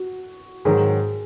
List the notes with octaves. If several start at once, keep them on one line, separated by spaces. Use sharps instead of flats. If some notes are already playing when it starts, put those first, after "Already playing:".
Already playing: F#4
G#2 D#3 F#3 G#4